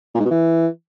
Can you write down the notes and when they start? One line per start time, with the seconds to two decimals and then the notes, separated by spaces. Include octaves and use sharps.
0.15 A#2
0.20 G#2
0.25 B2
0.31 E3